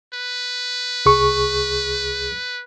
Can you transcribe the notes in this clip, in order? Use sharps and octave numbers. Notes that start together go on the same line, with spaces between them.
B4
C2 G#4 C#6